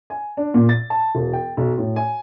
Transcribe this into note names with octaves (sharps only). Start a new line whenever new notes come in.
G#5
D4
A#2
A6
A5
E1
G5
B1
A2
G#5